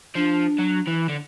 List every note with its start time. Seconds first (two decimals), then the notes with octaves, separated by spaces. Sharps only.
0.15 F3 D4
0.59 F#3
0.88 E3
1.09 D3